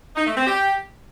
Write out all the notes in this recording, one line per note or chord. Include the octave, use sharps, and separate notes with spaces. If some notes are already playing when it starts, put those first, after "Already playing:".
D#4
A3
C4
G4